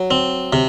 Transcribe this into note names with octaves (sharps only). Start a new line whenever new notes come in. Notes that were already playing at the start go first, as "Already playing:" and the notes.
Already playing: F#3
C4
C3